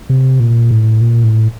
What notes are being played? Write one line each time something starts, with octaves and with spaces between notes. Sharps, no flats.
C3
A#2
A2
A#2
A2